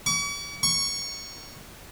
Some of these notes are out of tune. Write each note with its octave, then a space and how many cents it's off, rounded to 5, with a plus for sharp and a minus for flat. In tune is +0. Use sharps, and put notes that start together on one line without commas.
C#6 +45
C#6 +0